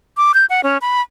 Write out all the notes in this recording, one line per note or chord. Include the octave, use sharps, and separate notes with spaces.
D6
G6
F#5
C#4
B5